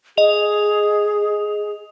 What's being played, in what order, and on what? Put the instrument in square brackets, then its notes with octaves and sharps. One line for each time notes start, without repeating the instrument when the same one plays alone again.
[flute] G#4 [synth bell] D#5 F7